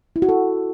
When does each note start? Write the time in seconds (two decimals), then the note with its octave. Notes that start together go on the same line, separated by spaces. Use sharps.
0.16 E4
0.22 F#4
0.29 A4